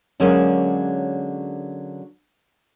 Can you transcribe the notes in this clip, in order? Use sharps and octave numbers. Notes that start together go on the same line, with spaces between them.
D3 F#3 G#3 A#3 C#4